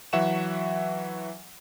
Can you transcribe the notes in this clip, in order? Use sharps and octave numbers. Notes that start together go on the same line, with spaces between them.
E3 F#3 E5 F#5 C#6 E7